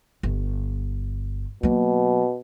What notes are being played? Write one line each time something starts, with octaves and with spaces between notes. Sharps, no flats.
G1
B2 F#3 A#3